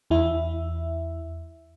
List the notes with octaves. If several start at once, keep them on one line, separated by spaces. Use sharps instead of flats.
E2 E4 E5